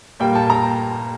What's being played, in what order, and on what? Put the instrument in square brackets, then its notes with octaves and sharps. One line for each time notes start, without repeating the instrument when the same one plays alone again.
[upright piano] A#2 G3 A#3 G5
A5
A#5